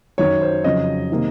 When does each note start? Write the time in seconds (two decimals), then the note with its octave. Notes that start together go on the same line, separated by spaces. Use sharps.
0.18 F#2 D#3 F#3 C#5
0.41 C5
0.64 F2 C#3 F#3 D#5
1.11 C3 D#3 A#3